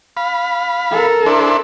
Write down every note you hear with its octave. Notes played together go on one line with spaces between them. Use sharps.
F5 B5
A4 A#4
D4 E4 C5